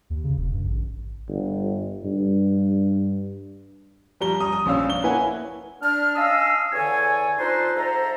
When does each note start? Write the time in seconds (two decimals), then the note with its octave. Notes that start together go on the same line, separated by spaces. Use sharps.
0.10 D#2
0.24 C#3
0.37 E1
0.54 G2
0.65 A1
1.29 G1
2.05 G2
4.20 F3 G3 A#5 G7
4.40 A#5 D#6
4.52 D#6
4.66 A#1 C#4 F5 E6
4.90 G7
5.04 A#3 E4 B4 C#5 F#5 G#5
5.82 D4 F6
6.15 C#4 D#5 F5 D#6 E6
6.73 E2 D3 A4 C#5 G#5
7.38 D4 D#4 F4 A4 B4 C5
7.76 G#2 A4 C5 E5 A#5